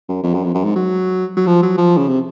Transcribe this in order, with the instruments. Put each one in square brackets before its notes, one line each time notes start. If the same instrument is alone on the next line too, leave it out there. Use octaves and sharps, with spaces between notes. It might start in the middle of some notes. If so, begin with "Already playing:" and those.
[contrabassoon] F#2
F2
F#2
F2
F#2
G#2
F#3
F#3
F3
F#3
F3
C#3
C3